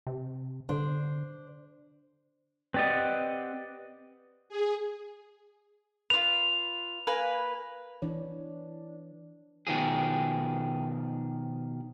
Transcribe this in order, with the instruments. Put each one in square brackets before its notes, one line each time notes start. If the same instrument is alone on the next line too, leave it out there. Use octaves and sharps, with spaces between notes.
[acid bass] C3
[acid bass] D3 [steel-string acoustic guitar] D4 C5
[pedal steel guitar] C4 G4 F#5 [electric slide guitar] B4 D5 D#5
[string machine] G#4
[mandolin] F4 B4 [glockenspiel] F7
[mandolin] A#3 B4 G#5
[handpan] E3 C#5 [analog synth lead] D4
[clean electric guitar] B2 D#3 F3 G#4